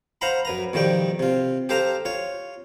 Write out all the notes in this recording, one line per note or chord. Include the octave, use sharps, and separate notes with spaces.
C5 F5 F#5 A#5 B5
F#2 B4 A#5
B1 D#3 F3 G3 G5
C3 F4
G4 A4 C5 F5 A#5
F4 C#5